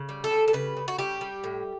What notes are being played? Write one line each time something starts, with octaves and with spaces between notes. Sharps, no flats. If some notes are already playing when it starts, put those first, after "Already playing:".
Already playing: C#3
G3
A4
G3
A4
C#3 B4
C#3
F#4
G3 G4
G3
A2